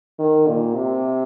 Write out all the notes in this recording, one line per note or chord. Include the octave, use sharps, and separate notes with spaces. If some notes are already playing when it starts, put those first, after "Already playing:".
D#3
A#2
C3